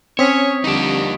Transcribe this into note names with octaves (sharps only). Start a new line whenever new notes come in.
C4 C#4 C#5 C#6 D#6 B6
D3 F3 G3 D#4 G4